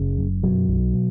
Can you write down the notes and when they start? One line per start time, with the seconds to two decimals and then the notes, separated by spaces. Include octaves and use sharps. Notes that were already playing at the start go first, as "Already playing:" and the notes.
Already playing: F#1 C#3
0.18 F#2
0.43 B2 F#3
0.68 B1
0.94 B2